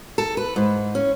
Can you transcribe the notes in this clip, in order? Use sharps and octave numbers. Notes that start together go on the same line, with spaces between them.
A4
B4
G#2
C#4